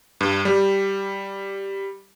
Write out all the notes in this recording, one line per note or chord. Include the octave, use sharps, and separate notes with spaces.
G2
G3